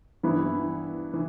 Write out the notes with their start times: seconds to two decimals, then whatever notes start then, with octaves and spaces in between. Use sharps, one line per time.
0.23 G2 E3 B3 E4
1.14 E3